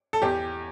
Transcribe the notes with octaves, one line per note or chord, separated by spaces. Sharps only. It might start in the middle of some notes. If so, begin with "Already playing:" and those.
A4
E2 G4